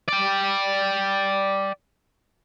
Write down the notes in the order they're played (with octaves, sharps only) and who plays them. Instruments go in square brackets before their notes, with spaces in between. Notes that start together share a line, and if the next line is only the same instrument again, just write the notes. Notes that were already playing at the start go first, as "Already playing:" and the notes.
[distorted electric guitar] D5 G5